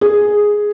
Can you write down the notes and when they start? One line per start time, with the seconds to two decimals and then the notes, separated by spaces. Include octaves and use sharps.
0.01 G#4